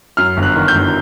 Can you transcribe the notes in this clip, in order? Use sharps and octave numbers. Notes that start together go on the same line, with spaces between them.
F#2 F6
G1
F#6
D#3
G6
G1